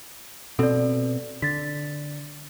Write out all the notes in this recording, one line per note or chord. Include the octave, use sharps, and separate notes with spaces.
B2 C4 A4 D5
D3 A6 B6